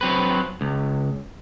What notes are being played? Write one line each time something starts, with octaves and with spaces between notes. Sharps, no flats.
F#3 C4 B4
C#2